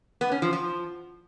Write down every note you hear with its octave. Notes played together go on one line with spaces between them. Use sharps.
B3
C#4
F3
F3